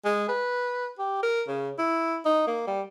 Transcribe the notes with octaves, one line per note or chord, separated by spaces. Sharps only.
G#3
B4
G4
A#4
C#3
E4
D#4
A#3
G3